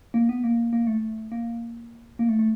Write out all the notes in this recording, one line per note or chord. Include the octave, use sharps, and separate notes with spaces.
A#3
B3
A#3
A#3
A3
A#3
A#3
A3
A3